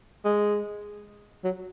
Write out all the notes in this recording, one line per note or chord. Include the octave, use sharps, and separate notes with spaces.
G#3
F#3